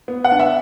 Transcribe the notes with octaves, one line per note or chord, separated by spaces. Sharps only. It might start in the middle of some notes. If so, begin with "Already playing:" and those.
B3
F#5
D4
E5